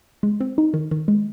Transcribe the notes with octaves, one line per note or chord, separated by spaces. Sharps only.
G#3
C4
D#4
D#3
D#3
G#3